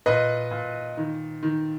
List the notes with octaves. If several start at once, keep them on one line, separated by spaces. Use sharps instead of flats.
A#2 B4 D#5
A#2
D#3
D#3